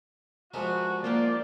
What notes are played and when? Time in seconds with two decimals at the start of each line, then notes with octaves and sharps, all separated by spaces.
0.54 F3 G3 G#3 B3 F#4 A#4 E5
1.04 A#3 D4 F4 G4 D5